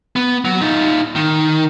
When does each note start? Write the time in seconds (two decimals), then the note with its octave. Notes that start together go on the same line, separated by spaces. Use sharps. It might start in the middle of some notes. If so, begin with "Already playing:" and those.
0.16 B3
0.45 F#3
0.61 D#4 F4
1.16 D#3